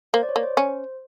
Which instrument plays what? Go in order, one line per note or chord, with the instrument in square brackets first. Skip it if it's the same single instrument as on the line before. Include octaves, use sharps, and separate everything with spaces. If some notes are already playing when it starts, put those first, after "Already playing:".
[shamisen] A#3 [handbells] C5
[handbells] D5
C#5
[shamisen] A#3
[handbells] C5
[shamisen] C#4